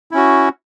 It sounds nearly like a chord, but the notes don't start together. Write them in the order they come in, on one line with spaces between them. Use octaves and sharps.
E4 C#4 F#4